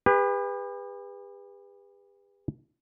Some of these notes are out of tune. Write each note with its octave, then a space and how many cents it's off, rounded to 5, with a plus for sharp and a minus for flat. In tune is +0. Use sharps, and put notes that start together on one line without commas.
G4 +45 B4 +0